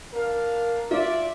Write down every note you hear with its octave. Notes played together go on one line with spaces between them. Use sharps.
D4 A#4 F5
F4 D5 E5